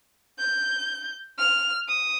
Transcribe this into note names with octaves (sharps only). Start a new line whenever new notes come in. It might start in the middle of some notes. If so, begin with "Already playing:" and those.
G6
F6
D#6